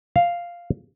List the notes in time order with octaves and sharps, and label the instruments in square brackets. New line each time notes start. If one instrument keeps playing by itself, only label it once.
[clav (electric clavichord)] F5